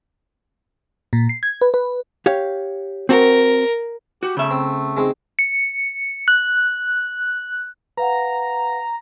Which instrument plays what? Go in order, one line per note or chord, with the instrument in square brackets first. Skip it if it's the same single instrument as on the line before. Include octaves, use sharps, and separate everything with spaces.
[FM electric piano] A#2
C7
G#6
B4
B4
[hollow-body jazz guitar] G4 C#5 F5
[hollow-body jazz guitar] C4 F#4 [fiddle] A#4
[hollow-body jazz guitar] F#4 [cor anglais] G4
[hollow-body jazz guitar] C#3 E5 [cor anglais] A3
[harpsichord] C4
G#3 C4 D#4
[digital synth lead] C#7
F#6
[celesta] B4 F5 F#5 [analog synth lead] A#5